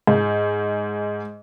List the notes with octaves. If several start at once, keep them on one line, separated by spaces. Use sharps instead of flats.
G#2